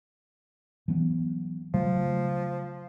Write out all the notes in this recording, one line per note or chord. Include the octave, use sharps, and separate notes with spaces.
E3 F#3 B3
C#3 F3 F#3 A3